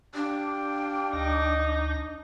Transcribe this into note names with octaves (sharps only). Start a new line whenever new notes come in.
D4 G4 F5 G5
D2 D#4 A#5